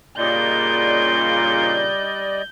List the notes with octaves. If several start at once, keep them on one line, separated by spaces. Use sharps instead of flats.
A#2 C#3 G3 D5 D#5 G6